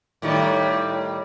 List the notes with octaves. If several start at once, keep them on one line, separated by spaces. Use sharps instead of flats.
A2 D#3 G3